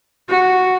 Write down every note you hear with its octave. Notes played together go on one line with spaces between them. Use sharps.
F#4